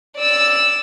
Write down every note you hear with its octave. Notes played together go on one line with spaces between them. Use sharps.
D5 E6